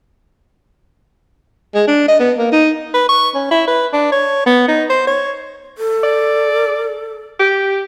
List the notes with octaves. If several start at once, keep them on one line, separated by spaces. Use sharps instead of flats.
G#3
D4
D#5
B3
A#3
D#4
B4
C#6
C#4
E4
B4
D4
C#5
B3
D#4
C5
C#5
A4
D5
G4